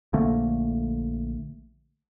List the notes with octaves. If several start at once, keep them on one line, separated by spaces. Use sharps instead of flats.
A#1 D3 A3 A#3